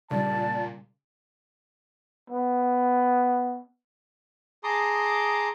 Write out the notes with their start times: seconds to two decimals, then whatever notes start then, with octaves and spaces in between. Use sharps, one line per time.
0.11 A#2 C#3 G3 D5 A5
2.30 B3
4.64 G#4 A5 A#5 C6 D6 D#6